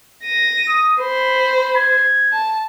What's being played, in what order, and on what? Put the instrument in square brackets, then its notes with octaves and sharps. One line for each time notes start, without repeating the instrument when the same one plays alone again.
[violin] A#6 D#7
[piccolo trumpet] D#6
[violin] C5 [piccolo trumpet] B5
[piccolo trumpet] G#6
[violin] A5